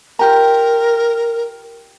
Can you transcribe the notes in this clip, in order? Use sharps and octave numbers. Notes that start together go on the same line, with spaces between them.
F4 G4 A#4 A#5